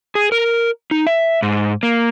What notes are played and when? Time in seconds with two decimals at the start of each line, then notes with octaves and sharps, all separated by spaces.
0.15 G#4
0.32 A#4
0.91 D#4
1.06 E5
1.42 G#2
1.83 A#3